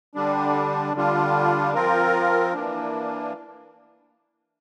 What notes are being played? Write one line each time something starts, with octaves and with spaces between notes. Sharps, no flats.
D3 G3 D4
D3 G3 D4 F4
F3 C4 F4 A#4
E3 A#3 D4